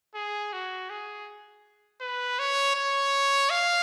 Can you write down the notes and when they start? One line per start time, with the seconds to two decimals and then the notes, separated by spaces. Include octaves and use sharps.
0.15 G#4
0.53 F#4
0.90 G#4
2.01 B4
2.39 C#5
2.76 C#5
3.50 F5